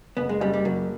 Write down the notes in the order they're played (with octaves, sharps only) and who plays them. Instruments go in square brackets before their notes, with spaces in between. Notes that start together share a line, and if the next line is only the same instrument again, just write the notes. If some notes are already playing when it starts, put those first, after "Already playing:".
[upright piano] F#1 [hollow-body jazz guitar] B3
[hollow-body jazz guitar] G#3
[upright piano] F#1 [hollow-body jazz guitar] G3
[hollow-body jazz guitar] G3
[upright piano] F#1 [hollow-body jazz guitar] F#3